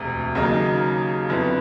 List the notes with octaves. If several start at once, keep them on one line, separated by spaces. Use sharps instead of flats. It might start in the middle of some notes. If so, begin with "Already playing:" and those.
Already playing: E1 D2 C3
D#2 C#3 F#3 A#3 D#4
F2 D3 F#3 B3 E4